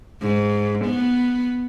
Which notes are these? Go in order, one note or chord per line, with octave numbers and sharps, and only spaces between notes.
G#2
B3